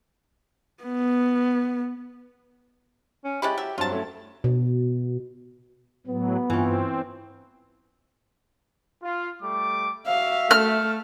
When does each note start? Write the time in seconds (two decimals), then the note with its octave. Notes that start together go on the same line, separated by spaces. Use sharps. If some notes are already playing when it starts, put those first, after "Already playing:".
0.84 B3
3.24 C#4
3.42 G#3 C#4 E4 G4 B5 A6
3.57 F#3 E5
3.78 G2 F#3 C4 F4 A5 A#5
3.92 A3 C#4 E4
4.44 B2
6.07 A2 F#3 B3
6.50 G2 E3 C4 C#4 F4
9.03 F4
9.41 G3 A3 D6
10.07 F#4 E5 F5
10.51 A3 F6